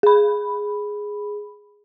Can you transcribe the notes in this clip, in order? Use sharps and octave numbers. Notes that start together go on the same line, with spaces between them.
G#4 B5